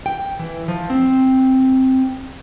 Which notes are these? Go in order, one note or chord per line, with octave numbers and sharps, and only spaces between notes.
G5
E3
F3
C4